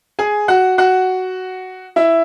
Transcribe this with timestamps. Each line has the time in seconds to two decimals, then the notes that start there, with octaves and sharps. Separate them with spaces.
0.19 G#4 G#5
0.48 F#4 F#5
0.78 F#4 F#5
1.96 E4 E5